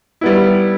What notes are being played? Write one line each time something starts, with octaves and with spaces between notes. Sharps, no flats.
G3 B3 E4